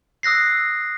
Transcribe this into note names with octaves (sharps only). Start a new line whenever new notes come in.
D#6 E6 F#6 A#6 C7